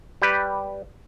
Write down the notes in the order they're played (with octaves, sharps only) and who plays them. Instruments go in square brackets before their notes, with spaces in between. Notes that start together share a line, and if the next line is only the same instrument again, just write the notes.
[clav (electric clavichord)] G3 G4 B4